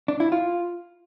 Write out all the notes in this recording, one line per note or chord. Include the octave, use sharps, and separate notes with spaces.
D4
E4
F4